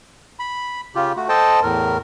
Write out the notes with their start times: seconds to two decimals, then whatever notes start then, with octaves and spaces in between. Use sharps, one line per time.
0.39 B5
0.95 C#3 F4 G4
1.17 A3 F#4
1.29 A4 C5 D#5 G5 A5
1.63 E2 A2 A#4